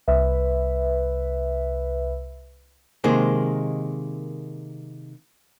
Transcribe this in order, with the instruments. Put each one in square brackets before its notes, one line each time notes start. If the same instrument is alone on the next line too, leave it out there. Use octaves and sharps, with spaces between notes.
[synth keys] C2 B4 E5
[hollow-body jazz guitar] C3 D#3 G#3 A#3 C5